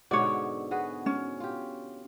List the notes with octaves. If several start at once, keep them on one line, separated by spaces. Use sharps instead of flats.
G#2 B2 D3 C#5 D5
B3 F#4 G#4
C#4
F4 G4